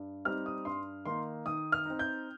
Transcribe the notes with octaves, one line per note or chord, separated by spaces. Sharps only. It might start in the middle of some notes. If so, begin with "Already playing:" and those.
Already playing: G2
G3 C4 D#4 F6
D#6
G2 C6
D#3 A#3 D#4 C6
D#3 D#6
F6
C4 D#4
G6